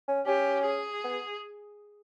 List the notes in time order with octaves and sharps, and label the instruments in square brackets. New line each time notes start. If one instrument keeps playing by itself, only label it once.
[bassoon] C#4
[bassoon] C#4 [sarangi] G4
[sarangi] G#4
[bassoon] B3